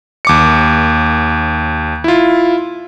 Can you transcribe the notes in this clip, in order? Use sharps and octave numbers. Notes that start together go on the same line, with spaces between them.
D#2 D6 C#7
E4 F4